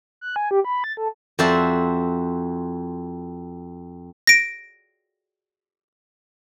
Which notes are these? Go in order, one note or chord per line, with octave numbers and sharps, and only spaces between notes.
F#6
G#5
G4
B5
A6
A4
F2 F#4 C5 D5 E5 A5
A#6 D7